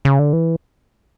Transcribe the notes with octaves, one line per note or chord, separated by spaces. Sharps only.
C#3
D3
E3